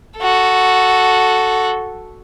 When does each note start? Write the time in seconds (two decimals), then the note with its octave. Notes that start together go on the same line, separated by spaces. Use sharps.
0.18 F#4 A4